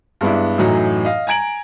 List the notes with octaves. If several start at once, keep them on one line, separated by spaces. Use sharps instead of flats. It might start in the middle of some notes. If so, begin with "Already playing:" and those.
G2 G#3 B3 D4 E4
F#2 A2 E3 F#3 D#4 A#5
D#5 F5
G#5 A#5 G#6 D7 F#7